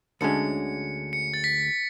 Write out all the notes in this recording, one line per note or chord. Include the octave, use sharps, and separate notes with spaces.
D2 D3 G#3 C#4 C#7
C#7
A6
B6